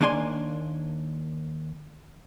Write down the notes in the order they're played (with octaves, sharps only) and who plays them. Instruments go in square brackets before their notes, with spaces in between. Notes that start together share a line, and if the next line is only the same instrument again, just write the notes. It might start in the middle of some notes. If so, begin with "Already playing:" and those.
[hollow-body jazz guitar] D#2 A#3 D4 G#5 C6